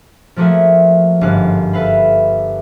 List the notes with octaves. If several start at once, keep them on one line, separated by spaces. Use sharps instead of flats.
F3 A3 A#3 F#4 G#4 E5
G1 G#2 F5 F#6
A4 B4 E5 F5 B5